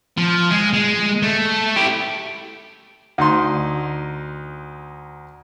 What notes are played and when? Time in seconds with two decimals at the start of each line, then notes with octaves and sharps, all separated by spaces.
0.18 F3
0.51 G#3
0.74 G#3
1.23 A3
1.76 E4 G4
3.18 D2 D#4 C6